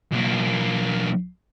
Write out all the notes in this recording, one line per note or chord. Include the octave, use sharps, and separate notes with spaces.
B1 A#3